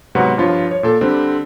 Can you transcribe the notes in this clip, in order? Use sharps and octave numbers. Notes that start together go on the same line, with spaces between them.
G#2 C3 F#3 B3 F#4
G2 F3 F4 C#5
C#5
A#2 A4
D3 G3 C4